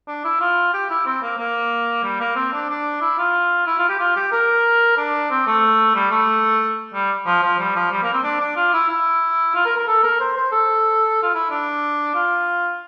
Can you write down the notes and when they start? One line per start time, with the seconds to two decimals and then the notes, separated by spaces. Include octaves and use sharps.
0.08 D4
0.24 E4
0.41 F4
0.73 G4
0.90 E4
1.06 C4
1.22 A#3
1.38 A#3
2.04 G3
2.20 A#3
2.36 C4
2.53 D4
2.69 D4
3.01 E4
3.18 F4
3.67 E4
3.78 F4
3.89 G4
3.99 F4
4.16 G4
4.32 A#4
4.97 D4
5.31 C4
5.47 A3
5.95 G3
6.11 A3
6.94 G3
7.26 F3
7.43 F3
7.59 G3
7.75 F3
7.92 G3
8.03 A#3
8.13 C4
8.23 D4
8.40 D4
8.56 F4
8.73 E4
8.89 E4
9.55 F4
9.66 A#4
9.76 A#4
9.87 A4
10.03 A#4
10.20 C5
10.37 C5
10.52 A4
11.23 F4
11.34 E4
11.51 D4
12.15 F4